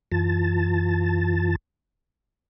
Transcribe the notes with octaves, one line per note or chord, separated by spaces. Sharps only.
F#2 E3 F4 A5 A6